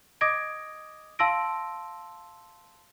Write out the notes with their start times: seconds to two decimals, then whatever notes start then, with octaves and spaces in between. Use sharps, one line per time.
0.21 D#5 D6 D#6 G#6 A#6 D7
1.19 F5 A5 C6 E6 A#6 D7